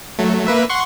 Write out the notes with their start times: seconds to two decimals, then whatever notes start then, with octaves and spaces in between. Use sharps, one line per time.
0.18 F#3 A3
0.47 A#3 B4 E5
0.70 F#5 C6 C#6